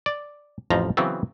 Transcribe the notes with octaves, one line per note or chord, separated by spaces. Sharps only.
D5
A1 F2 F3 A#5
C#3 E3 F#3 B3 C4